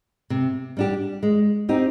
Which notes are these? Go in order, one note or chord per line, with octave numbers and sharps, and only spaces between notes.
C3
G3 D4 G4
G#3
C4 D#4 G4